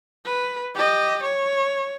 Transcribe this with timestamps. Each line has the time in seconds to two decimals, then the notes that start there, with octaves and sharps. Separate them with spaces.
0.25 B4
0.75 G4 D#5
1.23 C#5